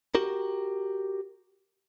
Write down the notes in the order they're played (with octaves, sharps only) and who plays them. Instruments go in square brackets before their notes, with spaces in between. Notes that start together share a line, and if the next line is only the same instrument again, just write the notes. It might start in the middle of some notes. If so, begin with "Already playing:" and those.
[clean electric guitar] F#4 G4 A#4